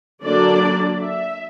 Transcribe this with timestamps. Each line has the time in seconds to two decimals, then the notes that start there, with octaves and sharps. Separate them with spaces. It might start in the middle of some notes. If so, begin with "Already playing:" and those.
0.24 D3 F#3 A#3 D4 D5
1.01 E5